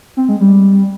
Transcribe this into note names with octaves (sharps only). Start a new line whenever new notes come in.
C4
G#3
G3